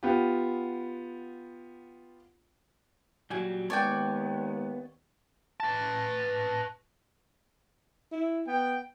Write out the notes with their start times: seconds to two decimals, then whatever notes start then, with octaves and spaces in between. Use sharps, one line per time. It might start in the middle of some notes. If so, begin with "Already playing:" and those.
0.03 B3 F4 G4
3.30 A#2 F#3 G3 F#4 G#5
3.70 D#2 G#3 B3 C#5 D5 G5 A5
5.60 B4 A5
8.12 E4
8.47 B3 G5